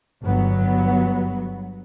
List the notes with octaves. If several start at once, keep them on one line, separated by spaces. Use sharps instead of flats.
G1 F#3 B3